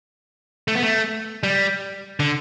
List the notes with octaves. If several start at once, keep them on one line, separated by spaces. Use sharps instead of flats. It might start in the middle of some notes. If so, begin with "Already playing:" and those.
A3
B3
A3
G3
D3